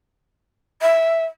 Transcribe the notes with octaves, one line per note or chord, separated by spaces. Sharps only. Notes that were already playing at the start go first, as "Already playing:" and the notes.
E5